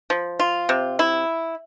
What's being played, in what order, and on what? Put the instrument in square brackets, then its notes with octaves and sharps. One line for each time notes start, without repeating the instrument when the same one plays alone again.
[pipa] F3
F4
C3
E4